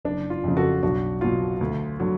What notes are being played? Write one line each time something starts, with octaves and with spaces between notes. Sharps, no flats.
F#1 D4
F4
F2 C#3
F#4 A4
B1 D4 F#4
B2 F#3 F4
D2
D3 F#3